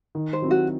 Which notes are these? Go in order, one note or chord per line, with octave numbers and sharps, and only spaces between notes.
D#3
C5
F#3 C4 E4
F#4